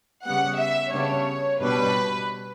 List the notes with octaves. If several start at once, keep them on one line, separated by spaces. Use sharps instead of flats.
C#3 G3 B3 F#5
E5
C#3 G3 B3 D4 C#5
B2 G3 D4 B4